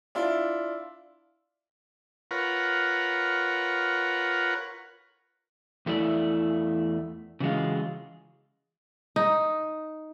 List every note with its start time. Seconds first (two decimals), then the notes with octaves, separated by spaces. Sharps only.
0.15 D4 E4 F4
2.31 F4 A#4 B4 C#5 F#5
5.86 E2 A3 E4 D5
7.40 C#3 E3 F#3 G#3 F4
9.16 D#4